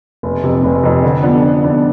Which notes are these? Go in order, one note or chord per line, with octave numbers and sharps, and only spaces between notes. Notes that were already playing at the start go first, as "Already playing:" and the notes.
F1
F2 C3
F1
F2 C3
D3
F3 B3 D4
D3
F3 B3 D4